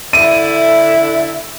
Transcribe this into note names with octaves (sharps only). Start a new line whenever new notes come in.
D3 E4 D5 E5 D#7